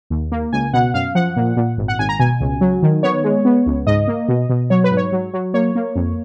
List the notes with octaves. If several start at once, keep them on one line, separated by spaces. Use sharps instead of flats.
D#2
A#3
C#2 G#5
B2 F#5
F#2 F5
F3 F#5
A#2
A#2
G#1
F#5
G#1 G#5
A#5
B2 G#5
C#2
F#3
D#3
B3 C#5
G#3
B3
C#2
G#2 D#5
A#3
B2
B2
F#3 C#5
B4
G#2
C#5
F#3
F#3
A#3 C#5
A#3
F2